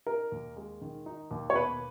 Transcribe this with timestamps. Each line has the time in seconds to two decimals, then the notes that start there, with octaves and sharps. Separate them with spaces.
0.06 D#4 A#4
0.32 D#2
0.57 G#3
0.81 D#3
1.06 D#4
1.31 D#2
1.50 C#5
1.55 B2 B4